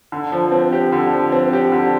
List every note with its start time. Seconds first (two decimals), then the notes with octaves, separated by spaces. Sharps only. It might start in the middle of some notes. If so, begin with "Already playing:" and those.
0.12 D3
0.32 F3
0.52 C4
0.72 G4
0.92 D3
1.13 F3
1.32 C4
1.53 G4
1.72 D3